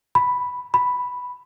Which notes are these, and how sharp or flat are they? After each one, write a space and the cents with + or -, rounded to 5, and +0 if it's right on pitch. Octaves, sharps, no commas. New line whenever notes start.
B5 +0
B5 +0